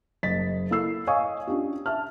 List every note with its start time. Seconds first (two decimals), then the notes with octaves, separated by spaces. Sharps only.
0.23 F#1 D#5 A6 B6
0.70 A#3 E4 A4 E6 C7
1.07 C#5 D#5 F5 G#5 C#6 D#6
1.47 C#4 D4 F4 G4
1.86 E5 A5 F6